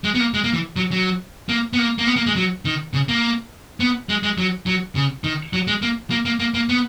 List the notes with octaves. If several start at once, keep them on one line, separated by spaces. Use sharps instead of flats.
G#3
B3
A#3
G#3
A#3
E3
F#3
F#3
A#3
B3
A#3
A#3
B3
A#3
G#3
F#3
D#3
C#3
A#3
B3
G#3
G#3
F#3
F#3
C#3
D#3
F#3
G#3
A#3
A#3
A#3
A#3
A#3
B3